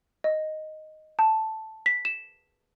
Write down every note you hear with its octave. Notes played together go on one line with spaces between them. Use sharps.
D#5
A5
B6
E7